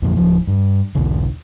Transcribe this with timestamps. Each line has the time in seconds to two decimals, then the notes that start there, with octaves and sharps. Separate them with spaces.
0.02 F2 A#2 F3
0.17 D1 F3
0.47 G2
0.95 B1 E2 B2 D3